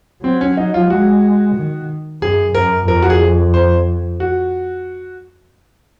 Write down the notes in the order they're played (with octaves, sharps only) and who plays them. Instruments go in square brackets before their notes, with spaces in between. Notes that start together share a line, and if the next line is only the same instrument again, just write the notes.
[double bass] F#3 [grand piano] C4
[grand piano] C#4
D#4
F4
[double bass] G#3 [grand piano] F#4
[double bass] D#3
[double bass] F#2 [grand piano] G#4
[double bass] F#2 [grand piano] A#4
[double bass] F2 [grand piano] A#4
[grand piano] F#4
G#4
C5
F#4